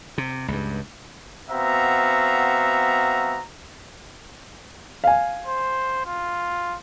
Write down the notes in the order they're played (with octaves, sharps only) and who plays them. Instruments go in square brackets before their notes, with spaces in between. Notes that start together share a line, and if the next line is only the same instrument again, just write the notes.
[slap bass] C3
C#2 G2
[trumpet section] B3 C4 F#4 E5 F5 A#5
[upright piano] F5 G#5
[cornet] C5
F4